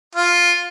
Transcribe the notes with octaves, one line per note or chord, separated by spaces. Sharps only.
F4